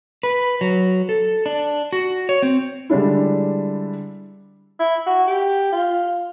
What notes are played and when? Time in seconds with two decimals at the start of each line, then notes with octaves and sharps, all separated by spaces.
0.23 B4
0.61 F#3
1.09 A4
1.46 D4
1.93 F#4
2.29 C#5
2.42 C4
2.89 D3 G3 G#3 D4 E4
4.80 E4
5.07 F#4
5.28 G4
5.73 F4